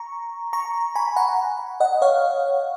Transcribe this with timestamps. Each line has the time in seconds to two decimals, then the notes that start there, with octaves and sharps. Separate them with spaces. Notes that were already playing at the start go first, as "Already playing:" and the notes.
Already playing: A#5 C#6
0.53 A#5 C#6
0.95 G#5 B5
1.16 F#5 A#5
1.80 D#5 F#5
2.02 C#5 F5